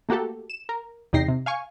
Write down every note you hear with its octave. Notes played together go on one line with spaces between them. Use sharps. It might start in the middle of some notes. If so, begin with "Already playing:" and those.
A3 A#3 F#4 G4 A4
E7
A#4
E2 C3 D#4 G5 A#6 C7
C3
F5 G#5 C#6